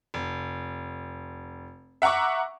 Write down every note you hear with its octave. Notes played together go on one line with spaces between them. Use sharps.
F1
E5 F#5 A#5 C#6 D6